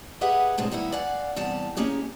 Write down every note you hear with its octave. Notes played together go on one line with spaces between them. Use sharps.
G4 G#4 B4 D#5 E5 F#5
A2 C3 G#3 C4 D4
D#3 G3 B3 E4
D5 F5 F#5 G#5
E2 C3 G3 A5
A#3 C#4 D#4 G4 G#4